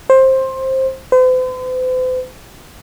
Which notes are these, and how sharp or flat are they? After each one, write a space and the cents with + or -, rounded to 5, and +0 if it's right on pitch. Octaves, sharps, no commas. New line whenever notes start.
C5 +15
C5 -45